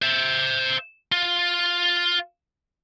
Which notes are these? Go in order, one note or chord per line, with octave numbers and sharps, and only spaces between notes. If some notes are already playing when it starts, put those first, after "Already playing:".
C5 E5
F4